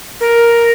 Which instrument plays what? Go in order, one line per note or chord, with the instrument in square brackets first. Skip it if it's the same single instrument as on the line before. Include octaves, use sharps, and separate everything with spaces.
[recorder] A#4